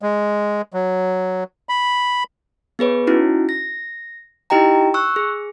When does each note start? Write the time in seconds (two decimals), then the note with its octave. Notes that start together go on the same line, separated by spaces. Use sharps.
0.02 G#3
0.73 F#3
1.69 B5
2.79 B3 G#4 B4 C#5
3.07 C#4 D#4 E4 F#4
3.49 A#6
4.50 D#4 E4 G4 D#5 G5 A#5
4.94 C#6 E6 F#6
5.16 G#4